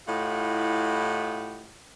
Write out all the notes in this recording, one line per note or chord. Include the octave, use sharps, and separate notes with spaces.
A2 E4 F4 G4 D#5 F#5